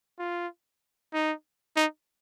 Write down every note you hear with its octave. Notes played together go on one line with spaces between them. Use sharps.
F4
D#4
D#4